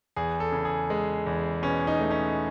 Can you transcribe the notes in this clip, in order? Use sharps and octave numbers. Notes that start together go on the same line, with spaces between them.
E2 G#4
A4
C#3
G#4
G#3
E2
B2 C#4
D#4
A3
C#4